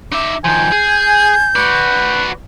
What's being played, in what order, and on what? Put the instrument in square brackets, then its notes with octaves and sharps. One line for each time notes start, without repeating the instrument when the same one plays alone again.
[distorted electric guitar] D#4 E5 [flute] D6
[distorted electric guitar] D#3 F3 [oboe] G#5 [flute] G6
[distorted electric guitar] G#4
[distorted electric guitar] F#4 D5 [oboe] B4